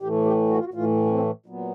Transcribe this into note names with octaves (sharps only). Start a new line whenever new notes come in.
A2 E3 A3 G4
G4
F#4
F4
F#4
A2 E3 A3 F4
C#4
C4
A#2 F#3 B3